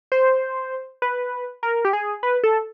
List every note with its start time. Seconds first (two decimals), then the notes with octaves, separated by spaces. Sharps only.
0.12 C5
1.02 B4
1.63 A#4
1.85 G4
1.93 G#4
2.23 B4
2.44 A4